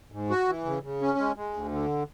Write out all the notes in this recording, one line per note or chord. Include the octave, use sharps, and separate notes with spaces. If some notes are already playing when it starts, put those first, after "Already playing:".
G#2
F#4
E3
C#3
C#3
C#4
G#3
G#3
D2
D3